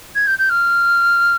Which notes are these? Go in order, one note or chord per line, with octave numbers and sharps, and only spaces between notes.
G#6
G6
G6
F6